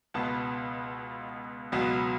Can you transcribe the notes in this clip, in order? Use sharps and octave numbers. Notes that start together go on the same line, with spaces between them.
C#2 B2 B3 A5
C#2 B2 F#3 B3